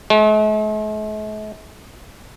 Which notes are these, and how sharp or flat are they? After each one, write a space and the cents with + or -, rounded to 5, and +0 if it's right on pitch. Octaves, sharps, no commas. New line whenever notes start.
A3 -45